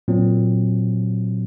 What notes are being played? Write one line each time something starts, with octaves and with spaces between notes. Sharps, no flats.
A#2 F#3 C4